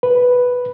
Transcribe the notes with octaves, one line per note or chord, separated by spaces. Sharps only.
B4